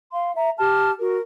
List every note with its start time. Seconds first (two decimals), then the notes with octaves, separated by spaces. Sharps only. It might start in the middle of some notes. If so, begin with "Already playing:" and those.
0.12 F5 C6
0.36 E5 A#5
0.59 G4 A5 F6
1.00 F#4 A#4